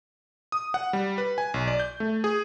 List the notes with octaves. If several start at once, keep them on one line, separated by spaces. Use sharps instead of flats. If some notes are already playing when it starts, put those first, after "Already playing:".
D#6
F#5
G3
B4
G#5
B1
D5
G6
A3
G#4